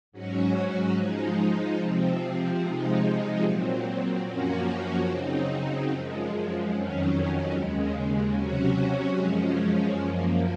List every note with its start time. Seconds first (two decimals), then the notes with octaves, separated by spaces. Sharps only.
0.12 G#2 F#3 C#4 F#4
0.95 F3 G#3 D#4
1.76 C3 F3 C4
2.59 C3 F3 G#3 D#4
3.42 A#2 F#3 C4
4.23 F#2 F3 A#3 C#4 F#4
5.05 C#3 F#3 C4 D#4
5.88 F#2 F3 G#3
6.70 F2 D#3 F#3 C#4
7.52 D#2 C#3 G#3
8.34 C3 F#3 C#4 F#4
9.16 F#2 F3 G#3 C#4
9.98 F#2 F3 A#3